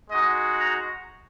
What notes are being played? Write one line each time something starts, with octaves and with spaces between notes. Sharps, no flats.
G#3 D#4 F#4 D#5
A#5